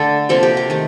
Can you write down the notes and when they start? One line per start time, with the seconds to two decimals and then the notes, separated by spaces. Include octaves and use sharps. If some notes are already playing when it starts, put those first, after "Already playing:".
Already playing: D3 A3 A4
0.29 C3 F3 A#3 A4
0.43 G4
0.57 G4
0.70 D#3 A3